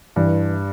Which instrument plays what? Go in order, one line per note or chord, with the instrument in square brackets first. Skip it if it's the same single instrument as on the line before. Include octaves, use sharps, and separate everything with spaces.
[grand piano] G2 [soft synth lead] E3